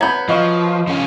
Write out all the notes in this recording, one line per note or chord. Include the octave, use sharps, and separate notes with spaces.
F#3 B3 B5 G6 G#6
F3 D#5 F5 C#6
F3 C#4 F4